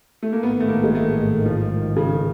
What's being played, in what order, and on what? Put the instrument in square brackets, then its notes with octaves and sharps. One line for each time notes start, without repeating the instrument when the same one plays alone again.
[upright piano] A3
A#3
[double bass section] A1 G#2 D#3 [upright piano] B3
[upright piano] A3
A#3
G#3
A3
F3
C#3